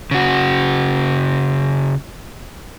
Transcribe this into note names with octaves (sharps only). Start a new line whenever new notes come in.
C#3 F#4